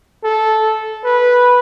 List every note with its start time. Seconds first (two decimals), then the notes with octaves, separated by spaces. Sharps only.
0.24 A4
1.04 B4